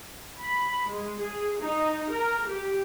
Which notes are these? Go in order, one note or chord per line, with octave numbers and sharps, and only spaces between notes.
B5
G#3
G#4
D#4
A#4
G4